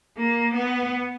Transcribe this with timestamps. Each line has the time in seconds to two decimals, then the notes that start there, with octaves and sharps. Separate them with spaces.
0.17 A#3
0.55 B3